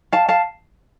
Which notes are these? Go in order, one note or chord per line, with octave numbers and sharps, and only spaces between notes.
F5 A5
F5 A5